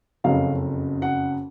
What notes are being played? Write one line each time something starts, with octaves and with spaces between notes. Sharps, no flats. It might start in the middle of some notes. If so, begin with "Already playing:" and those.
F#1 F2 C#3 F#3 F5
F#5